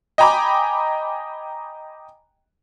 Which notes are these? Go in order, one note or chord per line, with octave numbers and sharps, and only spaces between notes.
D#5 G5 G#5 A#5 B5 D6